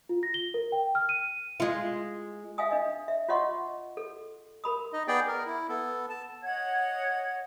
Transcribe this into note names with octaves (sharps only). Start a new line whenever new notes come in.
F4
A#6
G7
A#4
G5
F6
D#7
G#3 F4
E5 F5 G5 G#5 D#6
D4 D#5
E5
F4 C#5 D#5 F#5 C6 C#6
A4
A#4 B5 D#6
D#4 D#5
B3 G#4 D5 G5
A#4
E4
B3 A4
A5
C#5 D#5 F#5 G#6